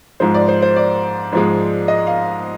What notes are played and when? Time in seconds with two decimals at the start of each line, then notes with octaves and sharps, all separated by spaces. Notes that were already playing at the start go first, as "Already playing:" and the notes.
0.20 G#2 F3 G#3 C5
0.34 D5
0.48 C5
0.62 C5
0.76 D5
1.32 G#2 F3 G#3
1.88 D#5
2.07 F5